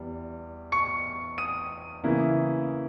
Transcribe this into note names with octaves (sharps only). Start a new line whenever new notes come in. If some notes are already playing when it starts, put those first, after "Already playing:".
Already playing: E2 G3
C#6 C#7
D#6 D#7
C#3 E3 A#3 E4